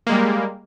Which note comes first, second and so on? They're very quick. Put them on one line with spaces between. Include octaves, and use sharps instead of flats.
A#3 G#3 G3